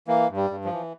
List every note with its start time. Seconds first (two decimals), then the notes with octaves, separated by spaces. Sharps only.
0.08 E3 A#3
0.29 G2
0.36 G3
0.51 G2
0.65 F3
0.72 E3